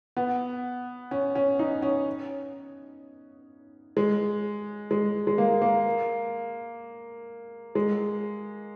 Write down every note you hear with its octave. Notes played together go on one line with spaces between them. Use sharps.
B3
C#4
C#4
D#4
C#4
G#3
G#3
G#3
A#3
A#3
G#3